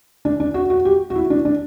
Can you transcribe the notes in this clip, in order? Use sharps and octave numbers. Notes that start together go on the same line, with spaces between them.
D4
D4
F#4
F#4
G4
F#4
E4
D4
D4